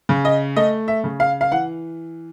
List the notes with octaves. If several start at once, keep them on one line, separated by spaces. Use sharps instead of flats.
C#3
D#5
A3 D#5
E5
C#3
F5
F5
E3 F#5